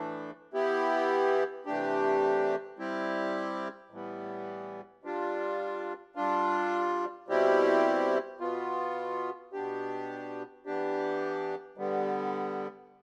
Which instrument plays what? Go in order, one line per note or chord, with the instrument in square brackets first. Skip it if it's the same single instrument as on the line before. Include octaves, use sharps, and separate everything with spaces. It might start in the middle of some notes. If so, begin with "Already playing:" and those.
Already playing: [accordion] A2 E3 A3 D4
E3 B3 E4 G4
C3 E3 A3 D4 G4
G3 C4 E4 G4
A2 E3 G3 B3
G3 D4 F4
G3 D4 F4
B2 G3 C4 E4 G4
B2 B3 F4
B2 B3 D4 G4
E3 B3 D4 G4
D3 G3 B3